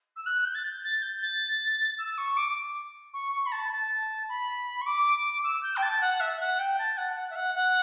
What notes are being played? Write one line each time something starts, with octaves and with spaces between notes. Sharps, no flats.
E6
F#6
G6
A6
G6
A6
G6
A6
E6
C#6
D6
C#6
C#6
B5
A5
A5
B5
C#6
D6
E6
G6
G5
A5
F#5
E5
F#5
G5
A5
F#5
F#5
E5
F#5
F#5